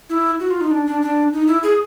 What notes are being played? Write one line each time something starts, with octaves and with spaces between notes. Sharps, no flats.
E4
F#4
F4
D#4
D4
D4
D4
D#4
E4
G#4